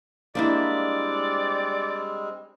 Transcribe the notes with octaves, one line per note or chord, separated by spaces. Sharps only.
G3 G#3 A#3 C4 D4 E4 D5